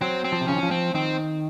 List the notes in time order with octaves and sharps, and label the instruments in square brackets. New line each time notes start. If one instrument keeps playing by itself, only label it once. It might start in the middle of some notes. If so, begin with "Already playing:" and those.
[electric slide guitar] F#3 [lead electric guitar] C4
[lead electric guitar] C4
[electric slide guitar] F3
C3
[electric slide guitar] C#3 [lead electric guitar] C#4
[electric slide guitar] D#3
F3
[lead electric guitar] C4
[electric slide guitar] D#3 [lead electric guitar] C4